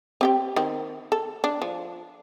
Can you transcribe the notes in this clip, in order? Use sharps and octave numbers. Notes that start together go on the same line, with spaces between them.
C4 G4 G5
D#3 C4
A4
D4
F3